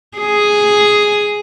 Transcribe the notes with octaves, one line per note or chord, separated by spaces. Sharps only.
G#4